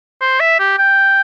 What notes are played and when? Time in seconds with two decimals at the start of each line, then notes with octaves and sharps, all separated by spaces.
0.21 C5
0.40 E5
0.60 G4
0.78 G5